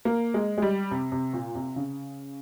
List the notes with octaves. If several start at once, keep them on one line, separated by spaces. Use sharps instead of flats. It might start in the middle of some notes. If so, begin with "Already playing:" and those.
A#3
G#3
G#3
G3
C3
C3
A#2
C3
C#3